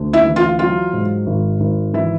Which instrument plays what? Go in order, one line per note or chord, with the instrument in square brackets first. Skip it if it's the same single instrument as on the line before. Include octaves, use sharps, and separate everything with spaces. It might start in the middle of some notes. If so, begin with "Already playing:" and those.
Already playing: [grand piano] D2
[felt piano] E4
[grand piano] E3
[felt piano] F4
[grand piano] F#3 [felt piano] F4
[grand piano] G#2
G#1
G#1
[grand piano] E3 [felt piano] E4